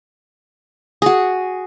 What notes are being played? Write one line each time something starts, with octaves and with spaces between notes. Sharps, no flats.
F#4 G#4